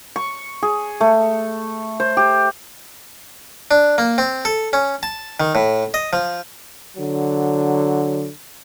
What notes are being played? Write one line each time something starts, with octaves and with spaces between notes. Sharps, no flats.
C#6
G#4
A3
C5
G4
D4
A#3
C4
A4
C#4
A5
D#3
A2
D#5
F3
D3 F#3